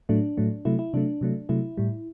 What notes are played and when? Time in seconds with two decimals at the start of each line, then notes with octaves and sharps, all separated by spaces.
0.09 A2 F#3 A3 D4
0.37 A2 F#3 A3
0.65 C3 F#3 A3 E4
0.79 E4
0.93 C3 F#3 A3 D4
1.21 C3 F#3 A3
1.49 C3 F#3 A3 E4
1.77 A2 G3